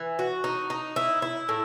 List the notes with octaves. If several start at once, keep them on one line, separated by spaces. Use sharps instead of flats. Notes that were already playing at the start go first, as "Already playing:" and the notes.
Already playing: E3
F#4
D#4
D#4
E4
E4
A2